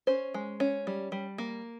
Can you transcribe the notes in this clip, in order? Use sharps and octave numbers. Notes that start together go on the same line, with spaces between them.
C#4 C5
G#3
C#4
G3
G3
A#3